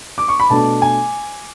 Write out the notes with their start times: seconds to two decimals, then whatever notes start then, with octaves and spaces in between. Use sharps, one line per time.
0.18 D6
0.28 C#6
0.40 B5
0.50 B2 A3 D4 A5
0.82 G#5